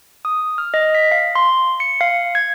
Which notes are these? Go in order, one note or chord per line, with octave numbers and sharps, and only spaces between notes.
D#6
F6
D#5
B6
F5
C6
C#7
F5
G#6